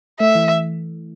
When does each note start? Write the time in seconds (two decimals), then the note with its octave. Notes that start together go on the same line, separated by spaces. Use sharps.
0.20 A3 E5
0.35 E3